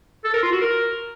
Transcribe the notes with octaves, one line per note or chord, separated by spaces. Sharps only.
A4
A#4
F4
F#4
A#4